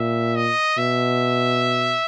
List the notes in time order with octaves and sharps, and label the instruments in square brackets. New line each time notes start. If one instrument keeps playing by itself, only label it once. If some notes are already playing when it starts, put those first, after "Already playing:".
Already playing: [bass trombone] A#2 [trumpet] E5
[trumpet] D#5
[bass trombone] B2 [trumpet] E5